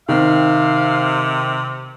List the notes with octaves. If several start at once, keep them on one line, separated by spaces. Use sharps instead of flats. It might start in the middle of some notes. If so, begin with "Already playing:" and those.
C3 D#3 C4 F5